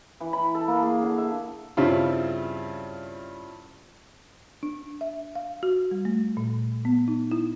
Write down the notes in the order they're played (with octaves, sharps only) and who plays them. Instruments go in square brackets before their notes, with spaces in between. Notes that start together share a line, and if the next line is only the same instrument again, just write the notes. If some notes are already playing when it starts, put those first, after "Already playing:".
[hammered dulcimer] E3
B5
A4
A#3
G#4
D3
E5
[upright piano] G2 C#3 G3 C4 E4 F4
[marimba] D4
E5
F5
F#4
G3
A3
A#2
B3
D#4
E4